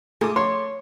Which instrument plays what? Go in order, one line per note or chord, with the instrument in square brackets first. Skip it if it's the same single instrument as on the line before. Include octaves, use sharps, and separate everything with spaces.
[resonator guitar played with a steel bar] G#2 G#4 [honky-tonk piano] A3 D6
[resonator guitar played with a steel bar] C#5 [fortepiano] C6